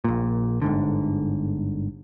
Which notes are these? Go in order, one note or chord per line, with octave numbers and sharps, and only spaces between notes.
A#1 A#2
G1 G#2 D3